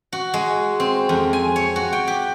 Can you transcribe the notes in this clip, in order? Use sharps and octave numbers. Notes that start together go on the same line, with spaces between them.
F#4
G#3
C4
F2
G#5
C#5
F#4
G5
G4